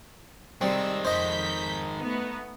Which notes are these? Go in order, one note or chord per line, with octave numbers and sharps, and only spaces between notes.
C3 D#3 G3 G#3 C4 E6
F2 C5 D#5 G6 B6
A3 B3 D#4